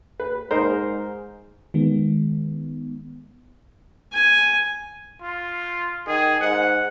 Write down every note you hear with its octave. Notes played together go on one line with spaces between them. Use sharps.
B4
G#2 D#4 A#4 C5
D#3 G#3 B3
G#5
F4
D#3 G#4
G#2 F#5